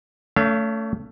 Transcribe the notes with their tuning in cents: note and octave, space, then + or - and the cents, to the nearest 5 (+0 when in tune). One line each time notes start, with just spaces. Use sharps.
A3 +15 C#4 +35 F5 -35